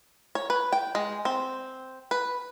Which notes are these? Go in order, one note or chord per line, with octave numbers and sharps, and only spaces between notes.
C#5
B4
G5
G#3
C4
B4